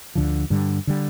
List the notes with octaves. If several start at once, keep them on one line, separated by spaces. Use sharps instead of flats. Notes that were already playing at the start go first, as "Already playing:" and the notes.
D2 D3 F3
G2 D3 G3
D3 G3